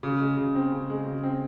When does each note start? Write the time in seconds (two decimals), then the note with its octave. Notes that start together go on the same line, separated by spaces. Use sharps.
0.03 C#3
0.20 G#3
0.37 C#3
0.55 C4
0.72 C#3
0.90 G#3
1.06 C#3
1.23 C4